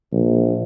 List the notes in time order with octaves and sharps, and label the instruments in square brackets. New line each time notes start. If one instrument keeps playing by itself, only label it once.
[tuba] A#1